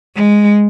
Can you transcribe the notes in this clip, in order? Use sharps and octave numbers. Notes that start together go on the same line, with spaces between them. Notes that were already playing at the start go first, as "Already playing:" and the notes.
G#3